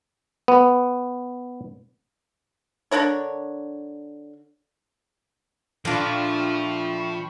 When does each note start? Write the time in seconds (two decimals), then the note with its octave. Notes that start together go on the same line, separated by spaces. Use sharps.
0.48 B3
2.91 D3 D4 A#4 C#5
5.85 A#2 F3 A3 D4 F4 G5 B5 C#6